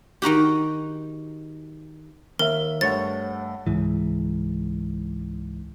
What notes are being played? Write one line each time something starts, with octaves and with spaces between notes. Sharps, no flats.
D#3 D#4 F#4 G4
D#2 A#4 E5 F6
G2 A3 C5 C#5 F#5 A6
C#2 G#2 E3